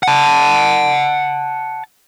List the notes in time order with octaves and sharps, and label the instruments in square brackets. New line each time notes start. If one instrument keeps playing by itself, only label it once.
[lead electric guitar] F#5 A5